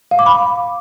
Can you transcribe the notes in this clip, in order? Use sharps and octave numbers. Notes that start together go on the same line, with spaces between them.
F5
D6
B5